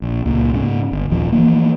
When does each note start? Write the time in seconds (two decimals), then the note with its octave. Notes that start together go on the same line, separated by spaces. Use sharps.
0.02 A#1
0.26 C#2 A#2
0.54 G#2 C#3
0.91 G1
1.10 D#1 F3
1.32 E3 F3 A#3